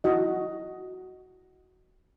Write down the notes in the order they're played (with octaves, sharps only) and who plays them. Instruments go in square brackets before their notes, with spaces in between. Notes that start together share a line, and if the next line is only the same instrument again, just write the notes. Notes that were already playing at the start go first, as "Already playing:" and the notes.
[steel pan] E4 F#4 D#5